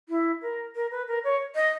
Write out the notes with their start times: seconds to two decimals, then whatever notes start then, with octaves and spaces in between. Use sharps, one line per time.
0.09 E4
0.42 A#4
0.75 A#4
0.91 B4
1.08 A#4
1.24 C#5
1.55 D#5